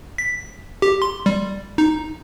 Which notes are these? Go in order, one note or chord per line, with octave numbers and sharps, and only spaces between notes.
B6
G4
C6
G3
D#4